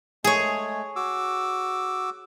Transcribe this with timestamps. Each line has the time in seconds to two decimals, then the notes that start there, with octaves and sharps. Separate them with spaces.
0.24 G#3 A3 G#4 C#5
0.96 F#4 D6 E6